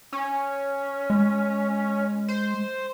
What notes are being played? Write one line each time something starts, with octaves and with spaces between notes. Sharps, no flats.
C#4
G#3
C5